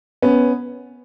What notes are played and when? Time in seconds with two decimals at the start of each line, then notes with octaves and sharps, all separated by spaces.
0.22 B3 C#4